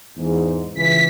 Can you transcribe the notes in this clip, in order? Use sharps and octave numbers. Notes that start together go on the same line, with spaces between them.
E2 G#2
C#2 E3 B6